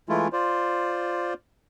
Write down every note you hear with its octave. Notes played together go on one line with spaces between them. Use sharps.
E3 G#3 A3 E4 F4
F4 C5 D5